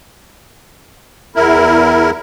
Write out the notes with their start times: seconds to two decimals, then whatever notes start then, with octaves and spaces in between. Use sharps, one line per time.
1.36 E2 E4 A#4